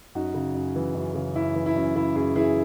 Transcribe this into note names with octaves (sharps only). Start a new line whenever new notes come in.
F#2 D#4 F#4
C#3
F#2
E3
F#2
C#3
F#2 E4
E3
E4
F#2
C#3 E4
F#2 E4 G#4
E3 E4 G#4